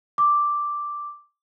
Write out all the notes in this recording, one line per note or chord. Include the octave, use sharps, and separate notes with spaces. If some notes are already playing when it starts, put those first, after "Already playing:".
D6